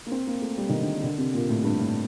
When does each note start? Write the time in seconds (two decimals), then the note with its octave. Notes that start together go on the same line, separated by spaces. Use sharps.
0.06 A#3
0.11 C4
0.27 A#3
0.42 A3
0.57 G3
0.69 D#3
0.81 D3
1.03 D3
1.18 C3
1.34 A#2
1.49 A2
1.64 G2
1.79 A2